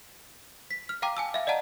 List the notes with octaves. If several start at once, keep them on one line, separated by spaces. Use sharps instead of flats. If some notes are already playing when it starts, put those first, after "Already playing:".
B6
F6
F5 G5 A#5 D6
G#5 A5 E6
E5 F5
D5 D#5 F#5 A5 A#5